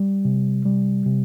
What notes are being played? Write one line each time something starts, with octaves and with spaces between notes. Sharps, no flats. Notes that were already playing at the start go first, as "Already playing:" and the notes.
Already playing: G3
C3
G3
C3